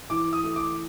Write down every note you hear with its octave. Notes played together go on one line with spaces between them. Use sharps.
E3 D6
D#6
A3
D6